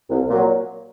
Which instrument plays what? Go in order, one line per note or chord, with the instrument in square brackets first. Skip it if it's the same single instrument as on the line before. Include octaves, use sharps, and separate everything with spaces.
[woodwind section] C2
A#2 F#3